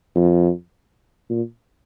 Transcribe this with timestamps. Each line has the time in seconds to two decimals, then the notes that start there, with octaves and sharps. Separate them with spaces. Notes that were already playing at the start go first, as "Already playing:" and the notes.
0.15 F2
1.30 A#2